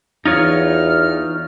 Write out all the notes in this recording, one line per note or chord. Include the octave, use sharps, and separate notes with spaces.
E2 D#4 F4 C#5 F6